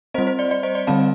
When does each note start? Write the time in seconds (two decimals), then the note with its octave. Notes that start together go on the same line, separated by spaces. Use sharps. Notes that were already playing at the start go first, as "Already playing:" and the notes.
0.14 C4 C5 D#5
0.18 G3
0.27 C5
0.39 D5
0.51 D5
0.63 C5 D#5
0.75 D5
0.87 D3 G3 C4 F5 A5